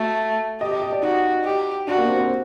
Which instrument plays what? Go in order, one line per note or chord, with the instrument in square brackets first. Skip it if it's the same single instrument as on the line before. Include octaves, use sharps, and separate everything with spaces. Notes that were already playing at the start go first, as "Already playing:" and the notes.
Already playing: [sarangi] A3 [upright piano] F#4
[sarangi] G4 [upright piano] D#5
[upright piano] D#5
D#5
D5
[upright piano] D#4 [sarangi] F#4
[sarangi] G4
[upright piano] D4 [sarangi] F#4
[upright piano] A#3
C4
C4